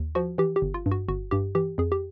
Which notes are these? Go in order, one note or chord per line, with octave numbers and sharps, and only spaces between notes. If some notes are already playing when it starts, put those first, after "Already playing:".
Already playing: D#2
F3 F#4
E3 G4
G4
G1
F4
G2
F#4
G1 F#4
G2 G4
E3 G4
F2 G#4
G4